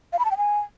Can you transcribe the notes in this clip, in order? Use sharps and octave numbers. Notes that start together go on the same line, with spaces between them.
F5
B5
A5
G5
G#5